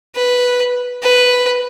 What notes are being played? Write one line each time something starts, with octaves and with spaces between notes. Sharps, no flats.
B4
B4